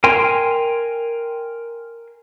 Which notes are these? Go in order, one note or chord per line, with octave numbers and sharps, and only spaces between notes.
A#4 G5 G#5 C6